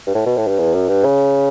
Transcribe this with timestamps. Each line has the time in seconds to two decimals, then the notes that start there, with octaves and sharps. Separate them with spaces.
0.07 G2
0.15 A2
0.26 B2
0.37 A2
0.48 G2
0.59 E2
0.74 F#2
0.89 G2
1.04 C#3